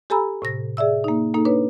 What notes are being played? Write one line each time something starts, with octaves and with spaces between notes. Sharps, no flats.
G4 A4 G#5 A#5 B5 E6
A2 C3 A#6
G#4 D5 E5 E6
A#3 D#4
A#3 D#4 A4
D4 B4 C#5